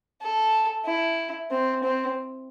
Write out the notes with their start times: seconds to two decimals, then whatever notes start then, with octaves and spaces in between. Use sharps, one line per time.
0.21 A4
0.85 E4
1.51 C4
1.83 C4